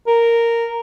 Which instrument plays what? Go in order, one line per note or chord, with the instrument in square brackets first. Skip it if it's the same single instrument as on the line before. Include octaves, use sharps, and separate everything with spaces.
[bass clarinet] A#4